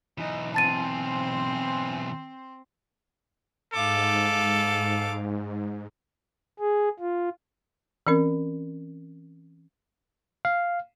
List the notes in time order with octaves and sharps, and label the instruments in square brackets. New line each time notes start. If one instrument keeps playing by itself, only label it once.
[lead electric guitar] B1 E3 [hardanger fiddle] D#4
[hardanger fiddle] C4 C5 [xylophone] A5 A6 D#7
[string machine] G#2 [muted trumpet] A4 [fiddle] F5 D6
[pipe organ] G#4
F4
[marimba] E3 C4 C#4 A#4
[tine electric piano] F5